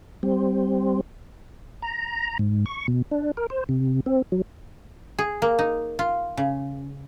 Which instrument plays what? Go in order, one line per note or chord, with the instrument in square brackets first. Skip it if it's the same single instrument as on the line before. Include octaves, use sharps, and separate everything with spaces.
[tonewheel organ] G3 C4
A#5
G#2
C#6
B2
D4
A#4
C5
C3
C4
F#3
[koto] G#4
A#3
D#4
F4
C#3